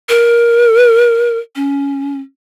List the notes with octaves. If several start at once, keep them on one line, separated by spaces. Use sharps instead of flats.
A#4
C#4